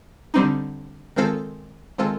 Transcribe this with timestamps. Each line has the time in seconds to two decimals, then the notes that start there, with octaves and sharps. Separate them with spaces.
0.34 D3 G3 C4 D#4
1.16 D#3 G#3 C4 F4 A4
1.98 D#3 G#3 C4 F4 A4